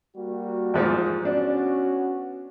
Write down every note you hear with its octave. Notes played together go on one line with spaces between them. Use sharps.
G3 A#3 F#4
E2 G#2 F3
B3 C#4 D4 F#4